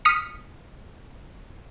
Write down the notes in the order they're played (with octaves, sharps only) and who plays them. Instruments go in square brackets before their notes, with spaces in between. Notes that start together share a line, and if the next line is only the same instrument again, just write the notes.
[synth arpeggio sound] D#6 F6 B6 C#7